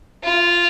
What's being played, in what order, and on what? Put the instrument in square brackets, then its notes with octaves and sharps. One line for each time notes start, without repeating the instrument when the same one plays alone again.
[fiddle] F4